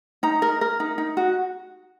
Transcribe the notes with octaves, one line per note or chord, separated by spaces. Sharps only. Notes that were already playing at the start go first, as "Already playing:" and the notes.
D#4 A#5
A#4
A#4
D#4
D#4
F#4